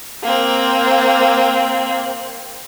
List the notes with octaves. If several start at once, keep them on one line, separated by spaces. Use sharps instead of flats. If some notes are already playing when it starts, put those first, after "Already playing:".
A#3 C4